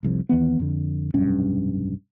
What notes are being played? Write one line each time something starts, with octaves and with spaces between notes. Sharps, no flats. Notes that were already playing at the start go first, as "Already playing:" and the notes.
F1 C2 F2
D#2 E3 B3
F2 D3
F1 B1 G2 C#4